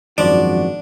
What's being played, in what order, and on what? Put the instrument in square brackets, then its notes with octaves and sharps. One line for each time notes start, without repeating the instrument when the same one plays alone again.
[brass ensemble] G#1 F#2 F#4 [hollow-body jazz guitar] F3 D5 [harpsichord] D4